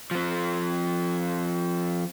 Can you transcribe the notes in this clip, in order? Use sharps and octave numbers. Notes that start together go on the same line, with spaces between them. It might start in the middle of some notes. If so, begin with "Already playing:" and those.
F3 C4